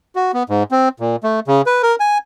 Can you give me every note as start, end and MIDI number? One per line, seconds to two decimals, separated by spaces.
0.15 0.32 66
0.34 0.43 59
0.49 0.63 44
0.71 0.89 60
1.00 1.16 46
1.23 1.40 57
1.47 1.62 49
1.66 1.82 71
1.83 1.95 70
2.00 2.18 80